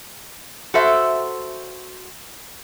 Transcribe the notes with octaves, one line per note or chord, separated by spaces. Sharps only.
F#4 A4 C5 E5